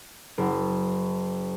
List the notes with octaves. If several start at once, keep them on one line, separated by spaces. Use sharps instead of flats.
F#1